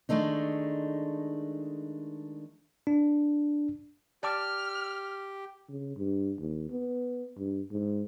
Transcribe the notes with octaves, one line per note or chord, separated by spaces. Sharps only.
D#3 G#3 A3 D4 D#4
D4
G4 D5 A5 D6 F6
C#3
G2
D#2
B3
G2
G#2